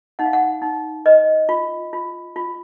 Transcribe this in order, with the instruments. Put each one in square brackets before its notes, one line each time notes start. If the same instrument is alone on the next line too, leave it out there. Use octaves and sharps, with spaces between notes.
[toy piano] D#4 F#5
F5
F#5
D#4
B4 D#5
F4
F4
F4